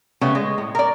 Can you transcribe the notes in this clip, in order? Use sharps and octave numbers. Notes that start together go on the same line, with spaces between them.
C#3 G3 A3 B3
G#3
A2
A#4 D5